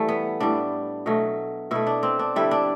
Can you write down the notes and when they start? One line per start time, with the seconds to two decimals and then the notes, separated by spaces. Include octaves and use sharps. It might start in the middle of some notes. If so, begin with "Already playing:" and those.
Already playing: A2 E3 G3 A3
0.09 B3
0.40 A2 G3 D4
1.06 B2 F#3 A3
1.71 B2 A3 E4
1.87 D4
2.03 C4
2.19 D4
2.36 G2 D3 G3 E4
2.51 D4